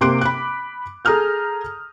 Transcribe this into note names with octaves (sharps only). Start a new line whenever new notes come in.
C3 A#3 C6 D6 F#6 D7
B5 F#6
G#4 A4 A#5 D#6 F6 G6